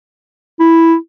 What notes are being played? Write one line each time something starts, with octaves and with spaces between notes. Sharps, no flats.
E4